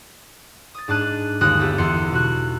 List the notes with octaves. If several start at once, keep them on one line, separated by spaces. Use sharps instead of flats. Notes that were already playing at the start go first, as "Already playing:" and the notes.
D#6 A6
G#2 D4 A5 F#6 D#7
G1 D#2 G#3 D#6 F#6
B3 E4 G4 A4
E2 C6 C#7
B2 F#4 F#6